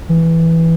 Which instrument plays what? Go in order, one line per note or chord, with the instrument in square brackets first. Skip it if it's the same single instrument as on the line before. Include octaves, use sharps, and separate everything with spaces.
[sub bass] E3